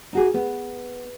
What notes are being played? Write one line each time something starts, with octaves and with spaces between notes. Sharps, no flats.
D#4 F#4 G#4
B3